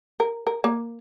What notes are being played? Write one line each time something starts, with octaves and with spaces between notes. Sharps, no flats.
A#4
A#4
A#3